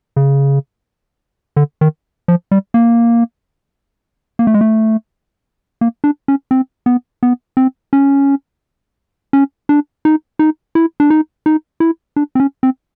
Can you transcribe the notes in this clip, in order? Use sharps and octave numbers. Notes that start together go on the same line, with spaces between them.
C#3
D3
D#3
F3
G3
A#3
A#3
A3
G#3
A3
A#3
D4
C#4
C4
B3
B3
C4
C#4
C#4
D4
D#4
D#4
E4
D4
D#4
D#4
E4
D4
C4
C#4
C4